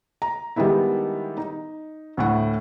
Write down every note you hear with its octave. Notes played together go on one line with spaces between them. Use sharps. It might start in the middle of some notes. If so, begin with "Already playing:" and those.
A#5
D#3 G3 G#3 B3 D#4 E4
D#4
D2 A2 F#5